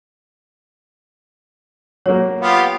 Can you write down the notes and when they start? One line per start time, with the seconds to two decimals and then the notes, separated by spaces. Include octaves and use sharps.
2.06 F#3 A#3 C#5
2.41 B3 F4 G4